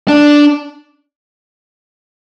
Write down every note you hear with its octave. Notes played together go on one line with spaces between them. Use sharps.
D4